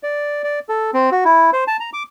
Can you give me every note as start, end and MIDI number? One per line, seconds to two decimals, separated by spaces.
0.03 0.42 74
0.44 0.59 74
0.69 0.91 69
0.94 1.10 60
1.12 1.24 66
1.25 1.51 64
1.53 1.64 72
1.68 1.77 81
1.80 1.90 82
1.93 2.03 86